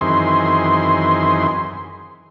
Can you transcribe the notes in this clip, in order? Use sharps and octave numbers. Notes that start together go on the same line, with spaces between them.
F#2 D#3 E3 C4 G#4 C6